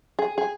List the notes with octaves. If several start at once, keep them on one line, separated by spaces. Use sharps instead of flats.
G#4
G#4